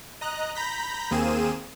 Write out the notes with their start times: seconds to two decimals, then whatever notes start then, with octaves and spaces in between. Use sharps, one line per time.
0.21 D#5 A#5 F#6
0.55 A#5 B5 G6 A#6 B6
1.11 D#2 A#3 C4 G#4 D#7 E7